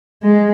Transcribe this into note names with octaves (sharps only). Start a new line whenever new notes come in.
G#3